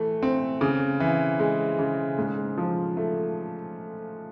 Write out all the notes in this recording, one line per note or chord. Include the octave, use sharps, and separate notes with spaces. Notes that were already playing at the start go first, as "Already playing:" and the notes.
Already playing: E3 A3
C4
C#3
E3
G#3
C#3
G#2
F3
A3